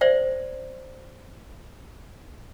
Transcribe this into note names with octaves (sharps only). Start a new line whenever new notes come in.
C5 D5 E5 G5